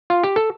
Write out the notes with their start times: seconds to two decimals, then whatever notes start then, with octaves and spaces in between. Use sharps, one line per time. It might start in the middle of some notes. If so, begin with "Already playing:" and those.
0.10 F4
0.23 G4
0.36 A4